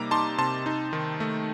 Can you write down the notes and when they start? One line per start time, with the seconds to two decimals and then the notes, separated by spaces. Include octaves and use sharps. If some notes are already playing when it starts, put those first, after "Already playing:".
Already playing: C3 G3 A#3 D#4 A#5 D6
0.11 D#4 A5 C6
0.38 C3 A5 C6
0.66 D#4
0.93 D#3
1.20 A3